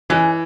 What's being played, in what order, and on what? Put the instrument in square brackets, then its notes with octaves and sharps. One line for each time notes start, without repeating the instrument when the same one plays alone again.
[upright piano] E3 [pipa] G#3 C#4